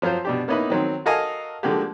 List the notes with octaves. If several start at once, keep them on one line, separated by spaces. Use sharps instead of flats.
F3 F#3 F4 C5
B2 D4 G4
A#3 B3 C#4 D#4 E4 B4
D#3 F#3 C4
F#4 A4 A#4 D#5 F5 G#5
D3 F3 G#3 A#3 F#4 G4